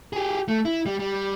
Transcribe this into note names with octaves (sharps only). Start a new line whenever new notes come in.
G4 G#4
A3
E4
G3
G3